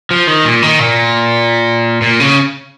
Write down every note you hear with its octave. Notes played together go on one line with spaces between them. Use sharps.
F3
D#3
A#2
D#3
A#2
A#2
C#3